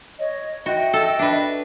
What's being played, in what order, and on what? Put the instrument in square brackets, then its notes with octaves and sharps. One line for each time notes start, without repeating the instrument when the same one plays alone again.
[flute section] C#5 D#5
[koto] F#4 [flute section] D#5 G5 [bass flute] E5
[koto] A4
D4 B4